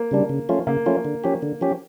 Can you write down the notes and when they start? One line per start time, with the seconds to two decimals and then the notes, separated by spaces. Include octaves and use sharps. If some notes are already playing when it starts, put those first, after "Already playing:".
Already playing: A#3
0.11 C#3 G3 D4
0.29 C#3
0.49 F3 A3 C#4 F4
0.67 C#3 A#3
0.86 F3 A3 C#4 F4
1.05 D3
1.24 F3 C#4 G4
1.42 D3
1.61 F3 C#4 G4